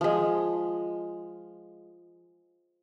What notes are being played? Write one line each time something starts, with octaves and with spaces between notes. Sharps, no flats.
F3 G#3